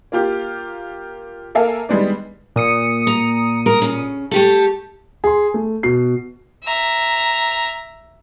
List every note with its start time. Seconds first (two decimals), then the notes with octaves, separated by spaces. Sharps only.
0.12 A#3 F4 G4
1.55 A#3 A4 A#4 E5 F5 G#5
1.89 D#3 G3 G#3 B3 D4
2.56 A#2 D#6 C#7
3.07 A#5
3.66 A#4
3.82 C#3
4.31 A3 G4 A4
5.24 G#4 C6
5.54 A3
5.83 B2 C7
6.64 E5 A#5